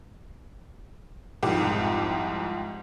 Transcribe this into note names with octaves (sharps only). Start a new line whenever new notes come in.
C2 F2 G#2 G4 D6